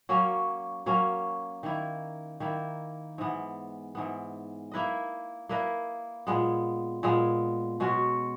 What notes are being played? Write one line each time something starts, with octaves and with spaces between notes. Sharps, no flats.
F#3 A#3 C#4
F#3 A#3 C#4
D#3 A#3 E4
D#3 A#3 E4
G#2 E3 B3
G#2 E3 B3
A#3 E4 B4 D#5
A#3 E4 B4 D#5
A#2 G#3 B3
A#2 G#3 B3
B2 G#3 C#4 F#4